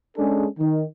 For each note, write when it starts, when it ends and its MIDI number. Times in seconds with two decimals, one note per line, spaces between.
0.17 0.46 56
0.17 0.46 61
0.17 0.46 62
0.17 0.46 68
0.17 0.46 69
0.59 0.83 51